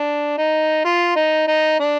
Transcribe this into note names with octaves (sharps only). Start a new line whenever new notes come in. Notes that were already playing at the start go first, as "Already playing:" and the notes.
Already playing: D4
D#4
F4
D#4
D#4
D4